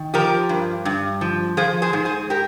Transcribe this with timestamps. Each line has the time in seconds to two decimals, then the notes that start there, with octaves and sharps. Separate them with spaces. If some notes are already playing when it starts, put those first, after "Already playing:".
Already playing: D#3
0.14 F3 G4 A#4
0.49 G2
0.85 G2
1.21 F3
1.57 F3 G#4 C5
1.82 G#4 C5
1.93 G#2
2.05 G#4 C5
2.30 G4 A#4